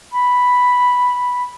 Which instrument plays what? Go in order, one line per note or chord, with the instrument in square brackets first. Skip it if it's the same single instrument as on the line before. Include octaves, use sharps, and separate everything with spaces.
[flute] B5